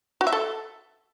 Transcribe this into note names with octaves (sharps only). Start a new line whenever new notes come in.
F#4
E5
A4